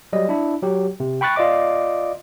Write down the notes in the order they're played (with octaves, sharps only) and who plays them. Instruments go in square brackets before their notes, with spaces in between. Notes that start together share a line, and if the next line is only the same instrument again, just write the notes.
[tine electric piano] F#3 G3 D#5
D4 E4
F#3 G4
C3
G5 B5 C#6 F#6 A6
F4 D5 D#5 D6